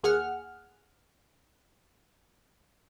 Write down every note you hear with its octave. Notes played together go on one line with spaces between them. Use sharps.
D#2 G#4 F#5 F6